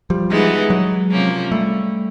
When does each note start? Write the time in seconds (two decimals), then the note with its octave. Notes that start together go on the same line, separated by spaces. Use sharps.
0.10 F3 G3
0.30 E3 G#3 B3 D#4
0.70 F#3 G#3
1.11 C3 F3 A#3 C#4
1.52 G3 A3